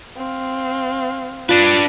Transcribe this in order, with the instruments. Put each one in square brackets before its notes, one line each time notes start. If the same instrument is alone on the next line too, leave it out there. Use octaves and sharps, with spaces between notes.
[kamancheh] C4 F5
[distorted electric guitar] D4 B4 [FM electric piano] F4